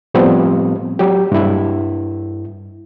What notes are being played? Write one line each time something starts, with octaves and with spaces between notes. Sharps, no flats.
A2 F3 G3 B3 C4
F#3 G4
G2 E4